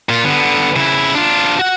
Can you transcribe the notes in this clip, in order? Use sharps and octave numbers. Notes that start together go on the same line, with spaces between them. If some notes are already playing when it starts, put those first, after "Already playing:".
A#2 F4
D3 B3
C#3 E4
D4 F4
F#4 F#5